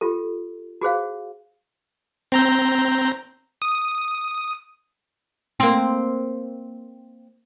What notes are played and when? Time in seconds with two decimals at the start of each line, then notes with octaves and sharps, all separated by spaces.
0.01 F4 G4 A4
0.81 F#4 G#4 C5 F5
2.32 C4 A#5 G6
3.62 D#6
5.60 A#3 C4